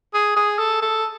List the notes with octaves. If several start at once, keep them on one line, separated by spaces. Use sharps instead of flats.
G#4
G#4
A4
A4